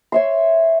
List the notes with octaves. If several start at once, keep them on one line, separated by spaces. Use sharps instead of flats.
C#5 E5 C6